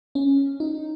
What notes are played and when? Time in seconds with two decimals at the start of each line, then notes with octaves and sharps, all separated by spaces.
0.15 C#4
0.60 D#4